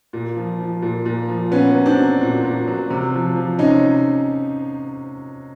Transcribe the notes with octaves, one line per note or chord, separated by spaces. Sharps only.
A#2
F3
F3
A#2
A#2
F3
A#2 B3 C#4
F#3
C4 D4
F#3
A#2
A#2
F#3
C3
F3
F3
C3 C#4 D#4